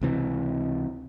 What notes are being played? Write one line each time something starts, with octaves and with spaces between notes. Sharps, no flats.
C#2 C3 E3